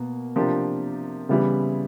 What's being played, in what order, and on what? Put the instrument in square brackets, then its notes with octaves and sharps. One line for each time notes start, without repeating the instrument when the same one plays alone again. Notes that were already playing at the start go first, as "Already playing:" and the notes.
Already playing: [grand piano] B2 A#3
C3 F3 A#3 D4 G4
C#3 E3 G3 B3 E4